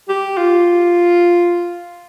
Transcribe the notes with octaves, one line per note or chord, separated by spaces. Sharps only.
G4
F4